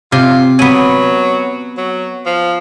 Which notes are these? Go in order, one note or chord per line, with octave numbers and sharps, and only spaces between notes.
C3 F4
F#3 B3 G#5
F#3
F3